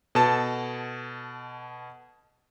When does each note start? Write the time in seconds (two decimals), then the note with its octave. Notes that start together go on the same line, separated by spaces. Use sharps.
0.15 B2 A4 A5